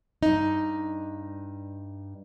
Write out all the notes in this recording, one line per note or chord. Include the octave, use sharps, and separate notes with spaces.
G2 D#4